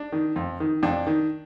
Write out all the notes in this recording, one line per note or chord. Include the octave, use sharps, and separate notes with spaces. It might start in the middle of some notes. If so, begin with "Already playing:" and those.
Already playing: D4
D#3
F2
D#3
F2 D4
D#3